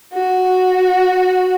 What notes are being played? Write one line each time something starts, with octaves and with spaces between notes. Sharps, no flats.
F#4